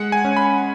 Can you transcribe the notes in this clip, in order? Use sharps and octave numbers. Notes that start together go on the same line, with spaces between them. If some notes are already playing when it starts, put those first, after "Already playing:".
Already playing: G#3 F#5
G#5
C#4
B5